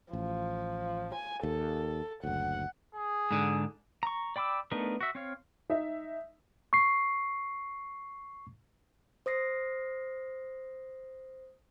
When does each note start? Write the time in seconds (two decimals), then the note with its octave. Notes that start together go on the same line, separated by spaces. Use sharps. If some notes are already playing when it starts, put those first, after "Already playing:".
0.13 A1 F3
1.15 G#5
1.43 D#2 A4
2.24 F#1 D2 F#5
2.95 G#4
3.31 G#2 D3
4.03 A#5 C#6
4.36 D5 G5 B5 D6 E6
4.71 A3 B3 D4 D#4 A#4
5.01 F#4 E5
5.15 C4 C#5 F5
5.70 D#4 E5
6.73 C#6 C7
9.26 C5 D#6 A#6 C7